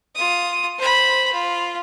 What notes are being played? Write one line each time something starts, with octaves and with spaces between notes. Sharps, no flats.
F4 D#6
C5 B5
F4